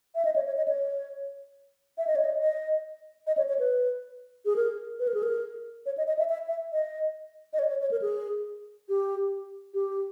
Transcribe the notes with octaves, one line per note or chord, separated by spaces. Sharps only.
E5
D#5
C#5
C#5
D#5
C#5
E5
D#5
C#5
D#5
D#5
D#5
C#5
C#5
B4
G#4
A#4
B4
A#4
G#4
A#4
C#5
D#5
D#5
E5
E5
E5
D#5
D#5
C#5
C#5
C#5
A#4
G#4
G4
G4